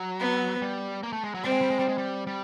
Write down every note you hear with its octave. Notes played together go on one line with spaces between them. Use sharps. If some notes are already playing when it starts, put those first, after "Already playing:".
Already playing: F#3
B3
G3
A#3
A3
G#3
F#3
G3 C4
G#3
G3
G#3
G3
G#3
G3
G3